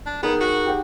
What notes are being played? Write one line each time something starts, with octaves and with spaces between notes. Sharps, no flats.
D4
B3 D#4 G#4 A#4
F#4
G4 F#5